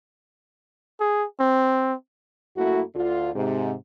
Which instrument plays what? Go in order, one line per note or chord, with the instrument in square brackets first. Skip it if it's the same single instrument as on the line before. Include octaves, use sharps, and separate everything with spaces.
[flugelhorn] G#4
C4
[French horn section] F#2 A3 A#3 E4 F#4
D2 D3 F4
G#2 C3